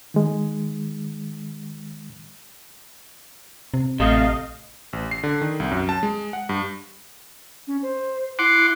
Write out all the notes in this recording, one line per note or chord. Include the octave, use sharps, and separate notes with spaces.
D#3 G#3
C3
A1 C3 A3 D#5 F5
A1
C7
D3
D#3
C2
F#2
A5
G#3
F#5
G2
C#4
C5
E4 F#5 C6 D6